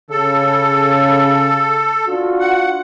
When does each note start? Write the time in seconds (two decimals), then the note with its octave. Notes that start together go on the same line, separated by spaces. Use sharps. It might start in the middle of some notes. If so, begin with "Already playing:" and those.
0.10 C#3 A4
2.07 D4 F4 F#4
2.40 F#5